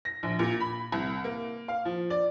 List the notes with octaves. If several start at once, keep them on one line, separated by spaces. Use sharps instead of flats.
A#6
A#1
A#2
B5
C2
A#3
F5
F3
D5